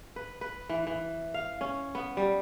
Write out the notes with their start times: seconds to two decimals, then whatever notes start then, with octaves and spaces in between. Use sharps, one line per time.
0.16 B4
0.41 B4
0.69 E3
0.87 E3
1.34 F5
1.61 C#4
1.95 B3
2.17 G3